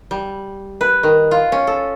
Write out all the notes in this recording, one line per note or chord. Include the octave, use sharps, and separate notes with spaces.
G3
B4
D#3
F4
C#4
A4